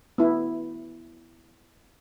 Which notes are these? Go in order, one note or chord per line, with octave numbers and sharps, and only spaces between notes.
B3 E4